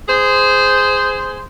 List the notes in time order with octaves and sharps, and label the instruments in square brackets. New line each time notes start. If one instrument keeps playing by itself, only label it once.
[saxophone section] G#4 C5